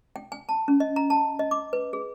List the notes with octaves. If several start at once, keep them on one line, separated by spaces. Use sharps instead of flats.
G5
G#5
A5
C#4
D#5
A#5
A5
D#5
D6
B4
G#4